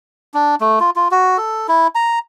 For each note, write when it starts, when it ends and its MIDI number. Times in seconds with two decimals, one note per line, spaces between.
0.34 0.55 62
0.61 0.79 57
0.80 0.90 65
0.96 1.08 65
1.11 1.38 66
1.38 1.67 69
1.68 1.87 64
1.95 2.19 82